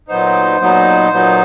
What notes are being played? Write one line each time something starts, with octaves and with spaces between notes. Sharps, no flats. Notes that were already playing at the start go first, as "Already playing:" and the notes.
A#2 F#3 B3 D#4 C5
A#2 F#3 B3 D#4
A#2 F#3 B3 D#4